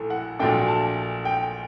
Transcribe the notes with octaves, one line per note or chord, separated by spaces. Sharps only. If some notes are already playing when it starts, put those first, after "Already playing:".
Already playing: A#1 A2 A4
F#5
A#1 A#2 F#3 A3 D4 G5
A5
G5